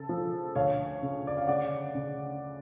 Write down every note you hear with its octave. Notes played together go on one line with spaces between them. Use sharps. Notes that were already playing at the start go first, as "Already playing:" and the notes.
Already playing: C#3 A4
F3
D2 C#5 F5
C#3
D5
F5
C#3 D5 F#5
C#3